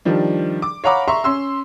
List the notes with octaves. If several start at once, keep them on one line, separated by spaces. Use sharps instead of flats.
D#3 F3 G3 D4
D6
C#5 F5 F#5 A#5 B5 D6
E5 A#5 C6 C#6
C#4 C6 E6